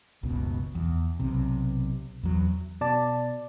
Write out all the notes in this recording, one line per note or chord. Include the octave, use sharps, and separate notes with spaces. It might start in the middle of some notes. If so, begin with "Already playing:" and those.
F#1 C#2 B2
E2
B1 C3
E2 F#3
B2 D5 A5